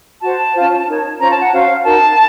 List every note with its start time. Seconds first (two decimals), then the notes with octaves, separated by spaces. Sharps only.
0.21 F#4 C5 A5
0.53 C#4 F4 C5
0.86 D#4 A#4 C#5
1.18 C#4 F4 C5 A#5
1.30 A5
1.40 F#5
1.51 C#4 F#4 C5 F5
1.83 D#4 F#4 A#4 A5